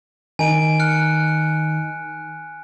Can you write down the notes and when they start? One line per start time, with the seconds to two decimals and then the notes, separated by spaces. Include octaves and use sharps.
0.39 D#3 D#4 G#5 D7 D#7
0.80 F6 F#6 C#7